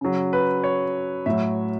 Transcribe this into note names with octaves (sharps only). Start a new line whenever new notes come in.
C#3 F#3
B4
C#5
A2 F#3 E5